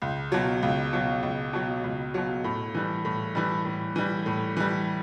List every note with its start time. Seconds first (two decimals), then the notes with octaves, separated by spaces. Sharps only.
0.02 C#2
0.32 B2 F#3
0.63 C#2
0.93 B2 F#3
1.23 C#2
1.53 B2 F#3
1.84 C#2
2.14 B2 F#3
2.44 A2
2.74 E3 G3
3.05 A2
3.35 E3 G3
3.65 A2
3.96 E3 G3
4.26 A2
4.57 E3 G3